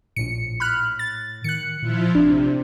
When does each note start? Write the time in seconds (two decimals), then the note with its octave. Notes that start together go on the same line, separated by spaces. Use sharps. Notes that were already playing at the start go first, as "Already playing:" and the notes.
0.16 A#1 A2 C#7
0.60 B5 F6 F#6
0.99 A6
1.44 D#3 F#6 C#7
1.82 A#2 F3 E4 F4
2.15 A1 C3 D4